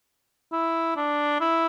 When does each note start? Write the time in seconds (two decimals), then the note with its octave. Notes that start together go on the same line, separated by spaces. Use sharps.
0.52 E4
0.96 D4
1.40 E4